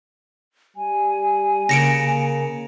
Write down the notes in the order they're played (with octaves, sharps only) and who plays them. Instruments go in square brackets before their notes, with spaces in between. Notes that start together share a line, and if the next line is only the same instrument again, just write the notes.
[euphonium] G3 [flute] G#5
[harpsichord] C#3 [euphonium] A#3 [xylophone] A#6 C#7 D7